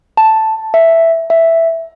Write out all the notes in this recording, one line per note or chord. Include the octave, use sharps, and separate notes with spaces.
A5
E5
E5